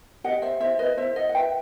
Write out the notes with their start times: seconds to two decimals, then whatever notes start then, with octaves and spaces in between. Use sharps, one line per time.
0.24 G4 D#5 F#5
0.42 C5 E5
0.60 E4 C5 E5
0.79 B4 D#5
0.97 E4 C5 E5
1.16 D#5 F#5
1.29 F#5
1.35 B4 E5 G5